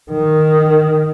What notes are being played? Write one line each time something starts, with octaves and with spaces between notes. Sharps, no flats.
D#3